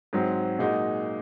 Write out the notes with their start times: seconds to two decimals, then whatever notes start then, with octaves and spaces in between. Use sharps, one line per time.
0.13 G#2 F#3 C4
0.59 A#2 G#3 D#4 F#4